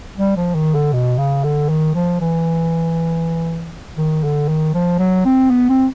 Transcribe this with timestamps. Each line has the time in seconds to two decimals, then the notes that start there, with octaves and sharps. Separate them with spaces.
0.18 G3
0.37 F3
0.55 D#3
0.75 D3
0.93 B2
1.19 C#3
1.44 D3
1.69 D#3
1.94 F3
2.21 E3
3.98 D#3
4.24 D3
4.49 D#3
4.74 F3
4.99 F#3
5.25 C4
5.50 B3
5.69 C4